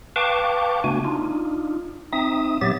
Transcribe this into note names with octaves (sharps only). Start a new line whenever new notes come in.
B4 F5 G5 A5 C#6 D6
C#3 A3 B3 D4 F#4 G#5
D4 D#4 F4
C4 D#4 E5 D#6
A#2 F#3 B3 G4 E5 A6